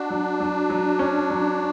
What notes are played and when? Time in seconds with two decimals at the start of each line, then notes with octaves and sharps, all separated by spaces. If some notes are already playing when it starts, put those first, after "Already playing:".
Already playing: D4 F#4
0.10 F#3
0.40 F#3
0.70 F#3
0.99 C#4
1.30 F#3